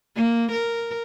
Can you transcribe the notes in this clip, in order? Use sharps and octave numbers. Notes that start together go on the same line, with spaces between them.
A#3
A#4